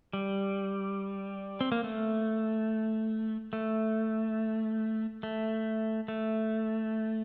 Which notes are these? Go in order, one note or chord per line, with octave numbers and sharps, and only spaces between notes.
G3
C4
A#3
A3
A3
A3
A3